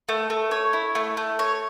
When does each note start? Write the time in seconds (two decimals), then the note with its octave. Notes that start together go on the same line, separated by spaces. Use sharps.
0.09 A3
0.30 A3
0.51 C#5
0.73 E4
0.95 A3
1.17 A3
1.39 C#5